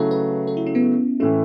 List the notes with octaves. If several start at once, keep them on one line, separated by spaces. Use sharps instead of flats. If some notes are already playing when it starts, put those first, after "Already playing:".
Already playing: C#3 F#3 A3 E4 A4
B4
A4
E4
C#4
B3
A2 E3 A3 C#4